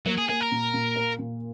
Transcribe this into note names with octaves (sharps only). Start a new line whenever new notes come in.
F#3 A#3
G#4
A#3 G#4
A#4
A#2
A#2
A#3
A#2